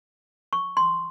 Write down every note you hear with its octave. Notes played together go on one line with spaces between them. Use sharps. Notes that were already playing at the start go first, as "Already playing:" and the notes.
C#6
C6